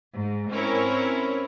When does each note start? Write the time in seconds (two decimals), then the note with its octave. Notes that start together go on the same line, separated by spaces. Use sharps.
0.17 G#2
0.52 C4 C#4 E4 A#4 C#5